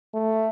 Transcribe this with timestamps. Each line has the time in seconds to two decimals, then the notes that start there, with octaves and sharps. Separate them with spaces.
0.15 A3